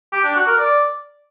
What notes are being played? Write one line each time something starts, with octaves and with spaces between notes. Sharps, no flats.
G4
D4
F#4
A#4
D5